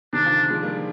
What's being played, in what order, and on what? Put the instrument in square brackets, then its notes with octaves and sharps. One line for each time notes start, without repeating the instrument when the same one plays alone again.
[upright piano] C3 D#3 [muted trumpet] D4
[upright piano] D3 F3
F3 G#3
G3 A#3